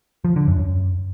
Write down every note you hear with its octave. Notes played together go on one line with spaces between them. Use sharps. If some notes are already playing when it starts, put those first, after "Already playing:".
F3
D3
F#2
F#2